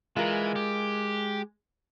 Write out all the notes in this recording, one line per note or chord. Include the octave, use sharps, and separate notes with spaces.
E3 G#3 F4 A#4
G4